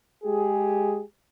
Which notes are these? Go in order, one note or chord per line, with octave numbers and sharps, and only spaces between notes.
G#3 G4 G#4